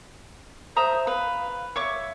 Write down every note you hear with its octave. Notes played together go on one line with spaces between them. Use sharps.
C5 E5 A#5 D#6
B4 F5
C#5 E5 C#6 D6